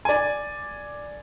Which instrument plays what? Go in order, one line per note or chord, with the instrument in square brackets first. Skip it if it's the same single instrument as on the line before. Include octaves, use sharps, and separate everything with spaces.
[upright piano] D5 G#5